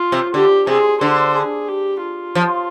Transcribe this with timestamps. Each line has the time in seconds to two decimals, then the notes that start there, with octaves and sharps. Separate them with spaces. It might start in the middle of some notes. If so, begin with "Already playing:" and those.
Already playing: F4
0.12 C3
0.34 D3 G4
0.67 C3 G#4
1.01 D3 C5
1.35 G#4
1.68 G4
2.02 F4
2.35 F3